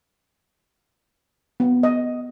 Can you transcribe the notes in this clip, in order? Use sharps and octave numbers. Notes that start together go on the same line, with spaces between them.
B3
D#5